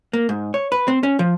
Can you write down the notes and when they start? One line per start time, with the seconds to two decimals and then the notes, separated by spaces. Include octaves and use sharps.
0.13 A#3
0.29 G#2
0.54 C#5
0.72 B4
0.88 C4
1.03 C#4
1.19 F3